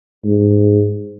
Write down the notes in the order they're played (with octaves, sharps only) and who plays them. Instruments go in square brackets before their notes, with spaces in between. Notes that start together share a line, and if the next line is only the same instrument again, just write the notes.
[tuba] G#2